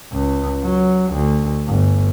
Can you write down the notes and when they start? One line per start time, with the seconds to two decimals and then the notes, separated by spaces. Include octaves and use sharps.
0.12 C#2
0.63 F#3
1.14 D2
1.68 G1